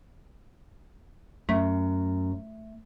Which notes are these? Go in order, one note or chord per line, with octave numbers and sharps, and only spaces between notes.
F#2 A3